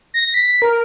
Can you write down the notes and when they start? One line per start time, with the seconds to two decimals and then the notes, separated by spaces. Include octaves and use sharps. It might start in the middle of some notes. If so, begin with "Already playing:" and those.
0.14 A#6
0.34 B6
0.62 A#4